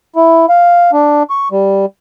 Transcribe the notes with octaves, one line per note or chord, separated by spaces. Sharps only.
E4
F5
D4
C#6
G3